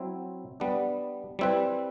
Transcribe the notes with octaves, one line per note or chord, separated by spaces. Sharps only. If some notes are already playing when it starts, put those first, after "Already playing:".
Already playing: F#3 C4 E4
G3 B3 D4
G3 C4 E4 B4